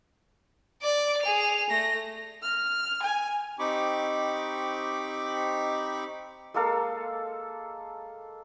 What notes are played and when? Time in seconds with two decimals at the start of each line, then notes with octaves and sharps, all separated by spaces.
0.82 D5 D6
1.22 G#4 F7
1.70 A3 A#6
2.42 F6
3.03 G#5
3.59 C4 D#4 G4 B5 C#6 D6
6.54 G#3 A#3 A4 F5